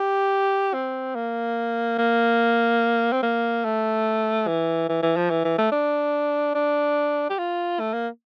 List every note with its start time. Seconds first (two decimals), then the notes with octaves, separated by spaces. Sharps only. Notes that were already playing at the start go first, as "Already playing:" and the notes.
Already playing: G4
0.74 C4
1.15 A#3
1.98 A#3
3.12 C4
3.23 A#3
3.65 A3
4.47 E3
4.89 E3
5.03 E3
5.16 F3
5.30 E3
5.45 E3
5.58 A3
5.72 D4
6.55 D4
7.30 G4
7.38 F4
7.80 A3
7.93 A#3